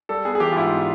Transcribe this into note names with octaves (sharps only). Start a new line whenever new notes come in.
G3 A4
B3 G#4
G#4
E3 G4
F4
G#2 E4
B3